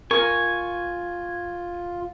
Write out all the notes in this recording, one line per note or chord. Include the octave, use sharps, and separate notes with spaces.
F4 A#4 G#5 C#6